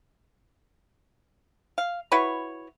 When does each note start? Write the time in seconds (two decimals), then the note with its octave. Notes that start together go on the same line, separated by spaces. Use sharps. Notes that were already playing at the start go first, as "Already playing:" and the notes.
1.78 F5
2.12 E4 F#4 B4 C#5